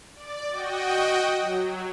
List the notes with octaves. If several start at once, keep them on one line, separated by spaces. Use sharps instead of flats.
D5
F#4 D#5 G5
F#3